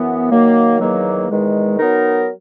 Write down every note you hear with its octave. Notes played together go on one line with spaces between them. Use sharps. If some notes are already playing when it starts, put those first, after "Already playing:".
Already playing: F#2 E3 B3
D#3 F#3 A#3
E2 D#3 F#3 A#3
E2 D#3 G#3
F#3 B3 D#4 A#4